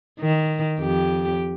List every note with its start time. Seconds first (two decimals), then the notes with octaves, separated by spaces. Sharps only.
0.20 D#3
0.79 F2 G4